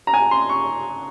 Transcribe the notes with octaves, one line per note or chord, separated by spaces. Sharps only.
A#5
G#5
C6
C#6